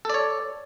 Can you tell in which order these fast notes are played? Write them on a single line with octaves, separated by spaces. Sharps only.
A4 D5 C#5